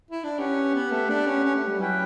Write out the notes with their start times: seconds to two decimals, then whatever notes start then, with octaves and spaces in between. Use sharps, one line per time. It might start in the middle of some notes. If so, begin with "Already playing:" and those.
0.11 E4
0.24 D4
0.38 C#4 G4 B4 F#5
0.74 B3
0.91 A3
1.09 D4
1.26 C#4
1.45 C#4
1.56 A3
1.67 G3
1.79 F#3 C#4 E4 B4 E5 G5